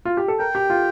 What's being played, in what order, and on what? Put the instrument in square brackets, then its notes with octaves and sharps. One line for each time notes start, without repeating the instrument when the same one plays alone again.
[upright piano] F4
G4
A4
[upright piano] A#4 [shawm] G5
[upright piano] G4
F4